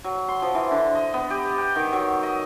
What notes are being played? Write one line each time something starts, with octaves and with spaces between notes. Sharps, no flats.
F#3
C6
F3
E3
D3
D#5
B3
G4
G5
D#3
F#3
D#5